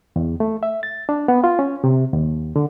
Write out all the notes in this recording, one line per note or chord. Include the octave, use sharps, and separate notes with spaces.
E2
A3
E5
A6
D4
B3
F4
C#4
C3
D#2
D3